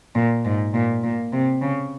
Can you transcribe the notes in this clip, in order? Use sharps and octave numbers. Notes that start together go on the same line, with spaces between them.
A#2
G#2
A#2
A#2
C3
C#3